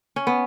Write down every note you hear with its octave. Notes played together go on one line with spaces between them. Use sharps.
C#4
B3